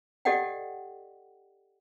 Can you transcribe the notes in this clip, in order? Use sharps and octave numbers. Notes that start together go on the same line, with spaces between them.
G4 A4 D5 D#5 F#5 G5